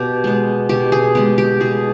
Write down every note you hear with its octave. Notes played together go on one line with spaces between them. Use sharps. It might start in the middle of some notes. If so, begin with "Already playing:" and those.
Already playing: B2 G4
G#3 B3
B2 G4
G#4
G#3 B3 G4
G4
B2 G#4